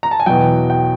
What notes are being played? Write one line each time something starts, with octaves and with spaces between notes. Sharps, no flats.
A#5
A5
G#5
E2 B2 F#3 G5
G5